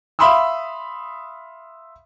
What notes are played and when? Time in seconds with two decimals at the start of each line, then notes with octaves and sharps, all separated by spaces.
0.19 E5 F5 B5 C6 D#6 E6